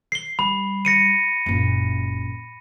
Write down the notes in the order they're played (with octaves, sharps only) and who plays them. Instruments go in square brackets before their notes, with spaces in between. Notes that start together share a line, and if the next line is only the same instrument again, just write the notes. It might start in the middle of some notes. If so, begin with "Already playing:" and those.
[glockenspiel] C7 G7
[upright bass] G3 [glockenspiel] B5
[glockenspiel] A#6 C#7 D#7
[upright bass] F#1 A#2